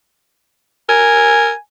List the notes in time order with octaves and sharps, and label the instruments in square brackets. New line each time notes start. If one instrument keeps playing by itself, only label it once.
[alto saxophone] A#4 [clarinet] G#5